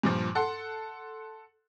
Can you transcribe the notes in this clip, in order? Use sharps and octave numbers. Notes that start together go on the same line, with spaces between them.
G2 A#2 F3
A4 F#5 C6